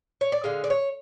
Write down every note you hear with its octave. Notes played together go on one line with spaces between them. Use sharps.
C#5
D5
D3 G#3 F5
D5
C#5